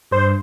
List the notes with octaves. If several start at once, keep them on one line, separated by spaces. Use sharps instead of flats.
G2 C5